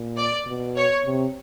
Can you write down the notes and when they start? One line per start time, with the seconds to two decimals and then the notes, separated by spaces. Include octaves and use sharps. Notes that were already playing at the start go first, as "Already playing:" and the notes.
Already playing: A#2
0.17 D5
0.47 B2
0.76 C#5
1.05 C3